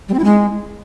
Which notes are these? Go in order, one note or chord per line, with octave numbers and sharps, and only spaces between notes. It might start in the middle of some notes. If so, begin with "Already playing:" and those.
G3
C4
E4
G#3